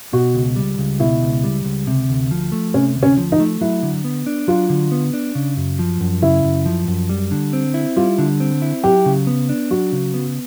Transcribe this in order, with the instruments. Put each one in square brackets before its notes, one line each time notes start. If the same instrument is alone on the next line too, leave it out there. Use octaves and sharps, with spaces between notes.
[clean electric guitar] B2 [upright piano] F#4
[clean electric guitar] C#2
G3
C#2
[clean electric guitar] B2 [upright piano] E4
[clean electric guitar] C#2
G3
C#2
C3
D2
F3
A3
[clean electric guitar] C3 [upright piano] C#4
[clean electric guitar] D2
[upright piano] C#4
[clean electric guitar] F3
[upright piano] D#4
[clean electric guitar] A3
[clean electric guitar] F#3 [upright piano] E4
[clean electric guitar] D3
B3
D4
[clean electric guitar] F#3 [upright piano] F4
[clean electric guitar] D3
B3
D4
C#3
F#2
F3
F#2
[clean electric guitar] C#3 [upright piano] E4
[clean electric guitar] F#2
F3
F#2
G3
D3
C4
E4
[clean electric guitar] G3 [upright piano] F4
[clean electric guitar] D3
C4
E4
[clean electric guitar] F#3 [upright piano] G4
[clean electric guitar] C#3
B3
D4
[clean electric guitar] F#3 [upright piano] F#4
[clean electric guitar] C#3
B3